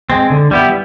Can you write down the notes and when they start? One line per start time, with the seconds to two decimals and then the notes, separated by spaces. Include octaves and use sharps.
0.10 G#3 C4
0.30 D3
0.51 G3 B3 E4 G4